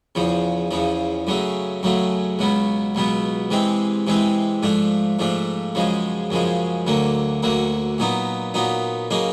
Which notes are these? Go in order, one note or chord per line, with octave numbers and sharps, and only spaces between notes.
E2 C#3 F3
E2 C#3 F3
F#2 C#3 F#3 A3
F#2 C#3 F#3 A3
C#2 B2 F#3 B3
C#2 B2 F#3 B3
C3 E3 G#3 C4
C3 E3 G#3 C4
G#2 F3 A3 D4
G#2 F3 A3 D4
F#2 C#3 F3 G#3
F#2 C#3 F3 G#3
D2 D3 F#3 A#3
D2 D3 F#3 A#3
A#2 F#3 B3 D#4
A#2 F#3 B3 D#4
C#3 F#3 A#3 D#4